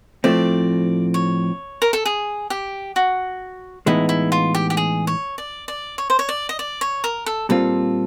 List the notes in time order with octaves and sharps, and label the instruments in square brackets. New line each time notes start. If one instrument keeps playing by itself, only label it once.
[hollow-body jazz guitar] A2 F3 A3 C4 [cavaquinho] D5
[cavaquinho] C#5
A#4
A4
G#4
G4
F#4
[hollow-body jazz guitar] A2 E3 G#3 B3 D#4 [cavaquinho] E4
[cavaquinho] E4
F4
G4
G4
G#4
C#5
D5
D5
C#5
C5
C#5
D5
D#5
D5
C#5
A#4
A4
[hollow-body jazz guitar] A#2 G3 C4 F4 [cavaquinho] A4